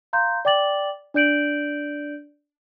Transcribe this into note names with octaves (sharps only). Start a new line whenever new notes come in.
F5 A#5 C6 G6
D5 G5 D6 A6 F#7
D4 D5 G6 D7 F#7